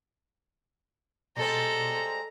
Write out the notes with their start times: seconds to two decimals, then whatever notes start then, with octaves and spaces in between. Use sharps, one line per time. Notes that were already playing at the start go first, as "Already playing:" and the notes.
1.36 B2 G3 G#3 C4 A4 A#5